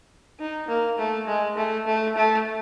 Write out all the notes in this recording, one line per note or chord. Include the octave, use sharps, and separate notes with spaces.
D#4
A#3
A3
G#3
A3
A3
A3